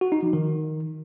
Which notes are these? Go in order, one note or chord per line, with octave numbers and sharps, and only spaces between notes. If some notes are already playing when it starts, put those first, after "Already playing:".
F#4
D#4
F3
D#3